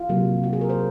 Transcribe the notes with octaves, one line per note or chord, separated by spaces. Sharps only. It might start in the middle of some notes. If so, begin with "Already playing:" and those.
Already playing: F4
C3 F#3 A#3
F#4
G#4
A#4
C5